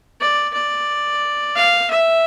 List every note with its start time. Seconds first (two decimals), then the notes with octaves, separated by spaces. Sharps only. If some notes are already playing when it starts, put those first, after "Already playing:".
0.21 D5
0.54 D5
1.56 F5
1.90 E5